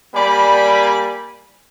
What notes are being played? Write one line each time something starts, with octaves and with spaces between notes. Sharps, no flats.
G3 A#3 D5 G#5 B5